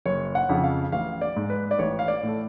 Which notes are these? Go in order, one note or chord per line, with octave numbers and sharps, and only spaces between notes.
F#1 C#5
F#5
F2 C#3
F5
A1 F5
D5
G#2
B4
D5
A1 C#5
F5
D5
A2
A4